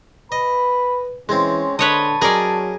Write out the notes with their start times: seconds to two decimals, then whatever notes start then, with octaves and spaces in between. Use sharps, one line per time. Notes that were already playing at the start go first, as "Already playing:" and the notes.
0.32 B4 D#5 B5
1.29 E3 G#3 C4 C#4
1.79 D3 B4 C#5 D#5 A5
2.22 F#3 C#4 G#4 A#4 D5 D#5